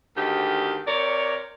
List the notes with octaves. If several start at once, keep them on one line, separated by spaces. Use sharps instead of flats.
D2 G#2 D#3 G4
C3 A#4 C#5 D5